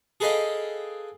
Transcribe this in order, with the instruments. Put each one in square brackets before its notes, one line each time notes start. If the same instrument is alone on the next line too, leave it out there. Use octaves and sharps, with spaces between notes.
[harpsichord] G#4 A4 B4 D#5 F5 G5